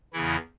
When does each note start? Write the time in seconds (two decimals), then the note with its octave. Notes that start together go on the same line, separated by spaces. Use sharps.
0.13 E2 C#3 E3 E4